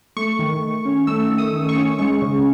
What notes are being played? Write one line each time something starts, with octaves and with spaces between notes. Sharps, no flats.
A3 C#6
D#3
D#3
C#4
A3 E6
D#3
D#6
D#3
C#6
C#4
G#3 C#6
C#3